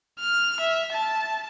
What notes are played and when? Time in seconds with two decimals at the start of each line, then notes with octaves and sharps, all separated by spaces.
0.20 F6
0.60 E5
0.92 A5